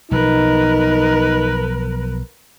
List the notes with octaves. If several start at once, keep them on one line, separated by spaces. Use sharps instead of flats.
B1 F3 D#4 A#4 B4